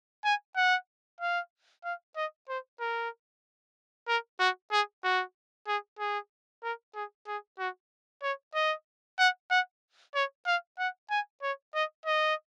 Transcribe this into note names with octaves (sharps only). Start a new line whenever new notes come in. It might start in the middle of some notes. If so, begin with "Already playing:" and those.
G#5
F#5
F5
F5
D#5
C5
A#4
A#4
F#4
G#4
F#4
G#4
G#4
A#4
G#4
G#4
F#4
C#5
D#5
F#5
F#5
C#5
F5
F#5
G#5
C#5
D#5
D#5